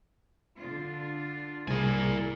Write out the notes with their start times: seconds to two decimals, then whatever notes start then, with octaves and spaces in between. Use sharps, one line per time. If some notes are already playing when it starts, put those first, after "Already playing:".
0.57 D3 D4 F4
1.68 C2 A#3 E4 G#4 A#4 D5 G#5